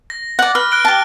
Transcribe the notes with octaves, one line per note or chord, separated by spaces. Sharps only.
A#6
D5 F#5
B4 F6
F#6 D7 G7
G4 A5